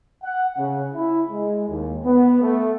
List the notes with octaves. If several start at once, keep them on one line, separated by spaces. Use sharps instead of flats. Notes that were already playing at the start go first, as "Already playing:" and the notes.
F#5
C#3
E4
G#3
D#2
B3
A3